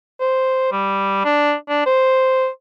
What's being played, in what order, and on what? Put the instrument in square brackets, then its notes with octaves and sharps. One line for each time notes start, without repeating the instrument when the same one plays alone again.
[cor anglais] C5
G3
D4
D4
C5